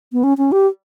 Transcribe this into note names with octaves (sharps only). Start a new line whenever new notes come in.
B3
C#4
C#4
G4